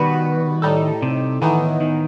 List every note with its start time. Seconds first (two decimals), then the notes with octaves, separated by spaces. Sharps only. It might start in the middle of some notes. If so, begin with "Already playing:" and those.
Already playing: B2 D#3 G3 B3 F#4 B4
0.62 A2 G3 D#4 A4
1.02 C3
1.41 A2 D#3 E3 B3 D#4
1.80 D#3